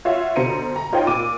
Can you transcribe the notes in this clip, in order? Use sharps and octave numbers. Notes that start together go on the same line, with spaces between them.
F4 F#4 C#5 E5 F5
B2 D3 C5 A#5 C#7 D#7
A#5
D#4 F4 C5 C#5 G5
A#2 D6 D#7